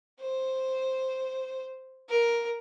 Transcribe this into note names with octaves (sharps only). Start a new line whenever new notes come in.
C5
A#4